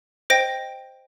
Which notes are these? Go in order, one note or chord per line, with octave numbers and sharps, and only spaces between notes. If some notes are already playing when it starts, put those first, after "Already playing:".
C5 D#5 G5 A#6 D7